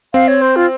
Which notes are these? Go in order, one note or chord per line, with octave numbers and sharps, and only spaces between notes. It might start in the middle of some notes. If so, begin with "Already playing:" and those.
C4 F5
C#5
C5
F4